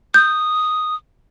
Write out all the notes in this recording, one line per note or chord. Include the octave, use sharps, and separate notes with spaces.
D#6 G6